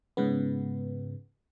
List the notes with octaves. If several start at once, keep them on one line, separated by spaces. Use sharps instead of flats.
G#2 C#3 B3